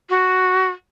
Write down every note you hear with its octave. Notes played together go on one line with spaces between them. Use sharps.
F#4